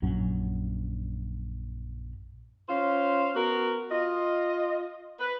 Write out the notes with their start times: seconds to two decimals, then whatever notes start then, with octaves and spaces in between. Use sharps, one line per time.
0.02 A#1 F#2 F#3 C#4
2.69 C#4 F4 C5 F5
3.36 B3 F#4 A#4
3.91 F4 D#5
5.20 B4